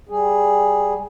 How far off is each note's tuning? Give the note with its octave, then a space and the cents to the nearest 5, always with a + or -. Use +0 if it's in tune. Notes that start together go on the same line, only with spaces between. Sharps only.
G3 +0 G#4 +0